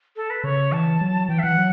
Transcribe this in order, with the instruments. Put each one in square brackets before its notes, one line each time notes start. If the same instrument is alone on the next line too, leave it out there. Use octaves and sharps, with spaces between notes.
[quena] A4
B4
[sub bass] C#3 [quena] C#5
[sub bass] E3 [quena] A5
[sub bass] F#3
[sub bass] E3 [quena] G5
[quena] E5
[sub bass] E3 [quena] F#5
[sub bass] F#3